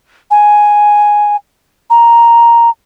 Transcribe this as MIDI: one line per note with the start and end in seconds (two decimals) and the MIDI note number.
0.31 1.36 80
1.90 2.70 82